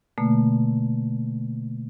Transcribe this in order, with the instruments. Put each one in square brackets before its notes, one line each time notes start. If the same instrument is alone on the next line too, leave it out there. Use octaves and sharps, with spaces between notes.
[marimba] B2 D3 A3 A#3